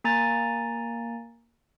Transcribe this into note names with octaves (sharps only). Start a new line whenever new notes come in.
A#3 G#5 A#5 A6